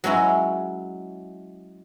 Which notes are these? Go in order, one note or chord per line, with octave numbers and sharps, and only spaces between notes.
F#3 G#3 C#4 E4